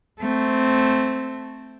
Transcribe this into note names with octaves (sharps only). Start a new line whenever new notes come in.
A3 C4